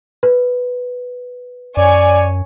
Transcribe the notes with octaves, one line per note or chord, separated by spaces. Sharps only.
B4
F#2 C#5 D5 G#5